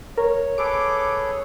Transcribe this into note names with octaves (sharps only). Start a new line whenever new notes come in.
A#4 C#5
G#4 A4 B4 D6 D7